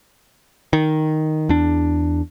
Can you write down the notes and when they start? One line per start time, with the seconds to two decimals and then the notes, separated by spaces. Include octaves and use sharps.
0.73 D#3
1.49 E2 D4